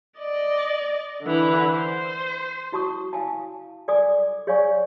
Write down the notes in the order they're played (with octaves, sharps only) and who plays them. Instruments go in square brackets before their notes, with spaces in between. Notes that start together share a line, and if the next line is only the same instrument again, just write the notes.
[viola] D5 D#5
D3 E3
C5
[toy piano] E4 F#4 A5 C#6 D#6
E4 F5 G#5 A5
A4 D5 G#5 D6 D#6
G#4 C#5 D5 F5 G#5 C#6